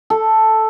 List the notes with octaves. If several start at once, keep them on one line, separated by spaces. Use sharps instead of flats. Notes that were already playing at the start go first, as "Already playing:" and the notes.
A4